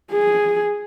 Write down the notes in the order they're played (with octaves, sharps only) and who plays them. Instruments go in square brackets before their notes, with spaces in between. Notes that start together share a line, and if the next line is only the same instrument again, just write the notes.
[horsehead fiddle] G#4